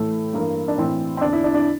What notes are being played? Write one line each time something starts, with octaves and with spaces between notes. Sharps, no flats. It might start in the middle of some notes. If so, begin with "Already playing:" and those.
Already playing: A2 E3 A3
G2 E3 A#3
D4
A2 E3 C4
C4
E2 D3 D4
E4
D4
D4